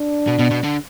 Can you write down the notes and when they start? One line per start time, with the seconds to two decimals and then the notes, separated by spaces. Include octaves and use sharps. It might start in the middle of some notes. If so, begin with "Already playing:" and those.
Already playing: D4
0.28 B2
0.39 B2
0.51 B2
0.64 D3